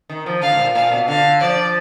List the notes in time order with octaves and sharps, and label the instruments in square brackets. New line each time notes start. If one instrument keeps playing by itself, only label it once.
[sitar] D#3
F3
[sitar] D3 [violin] F5
[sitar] G#2
A#2
[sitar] A#2 [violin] F5
[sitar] B2
[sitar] D3 [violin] F5
[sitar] F3 [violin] D5